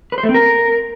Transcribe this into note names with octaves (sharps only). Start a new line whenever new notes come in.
B4
C5
A3
C4
A#4